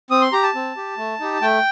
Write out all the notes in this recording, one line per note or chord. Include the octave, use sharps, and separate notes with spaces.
C4 D#6
C6
G4 A#5
A5
C4
G4
A3
D#4 G4
A3 G5